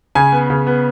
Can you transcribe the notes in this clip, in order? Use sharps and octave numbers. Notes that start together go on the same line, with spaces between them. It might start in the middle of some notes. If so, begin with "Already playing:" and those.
C#3 G#5
B3
C#3
B3